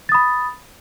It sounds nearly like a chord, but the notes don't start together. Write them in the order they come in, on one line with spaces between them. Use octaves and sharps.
A6 D#6 B5